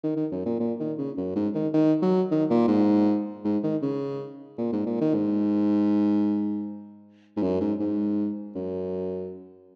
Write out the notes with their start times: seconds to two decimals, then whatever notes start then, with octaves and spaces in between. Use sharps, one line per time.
0.03 D#3
0.16 D#3
0.32 F#2
0.45 A#2
0.60 A#2
0.79 D#3
0.98 C#3
1.17 F#2
1.35 G#2
1.55 D#3
1.73 D#3
2.02 F#3
2.31 D#3
2.50 A#2
2.68 G#2
3.44 G#2
3.63 D#3
3.82 C#3
4.58 A#2
4.72 G#2
4.86 A#2
5.01 D#3
5.14 G#2
7.37 G#2
7.43 F#2
7.61 G#2
7.79 G#2
8.55 F#2